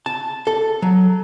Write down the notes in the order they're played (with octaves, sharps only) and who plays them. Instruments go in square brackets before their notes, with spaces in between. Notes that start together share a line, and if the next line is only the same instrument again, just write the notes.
[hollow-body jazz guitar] A5
A4
F#3